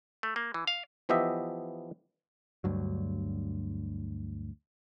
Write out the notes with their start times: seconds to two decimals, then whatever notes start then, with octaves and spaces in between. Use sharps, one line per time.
0.23 A3
0.36 A#3
0.54 E3
0.67 F5
1.09 E3 F3 B3 G4 D#5 E5
2.64 D2 G2 F#3